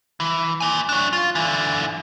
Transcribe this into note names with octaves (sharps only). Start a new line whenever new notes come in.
E3
A#3 G#5
D4 C#5
F4
D3 E3